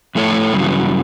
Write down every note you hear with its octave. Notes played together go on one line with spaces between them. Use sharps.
F2 A2 A3 E4 C#5
G2 C#3 E3 F#3